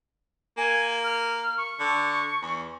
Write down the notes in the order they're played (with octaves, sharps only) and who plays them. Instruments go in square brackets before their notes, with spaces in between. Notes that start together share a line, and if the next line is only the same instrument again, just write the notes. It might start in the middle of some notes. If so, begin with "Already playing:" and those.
[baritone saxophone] A#3 [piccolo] G#5
[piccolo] F6
C#6
[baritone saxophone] D3
E2